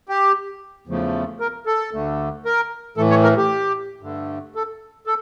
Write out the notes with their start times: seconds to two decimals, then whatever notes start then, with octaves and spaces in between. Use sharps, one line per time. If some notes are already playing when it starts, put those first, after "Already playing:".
0.09 G4
0.87 E2 C#3 F3 A3
1.40 A#4
1.66 A4
1.93 D2 D3 A3
2.45 A#4
2.97 A2 E3 A3 A4
3.10 C#5
3.23 A#4
3.37 G4
4.02 G2 D3 A3
4.55 A4
5.07 A4